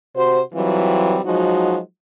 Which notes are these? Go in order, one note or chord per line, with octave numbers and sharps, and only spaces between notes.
C3 F#4 C5
E3 F#3 G3 C4 F4
F3 F#3 G#3 D#4 F#4